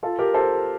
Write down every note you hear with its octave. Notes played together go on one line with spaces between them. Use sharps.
F4 A4
G4 A#4
A4 C5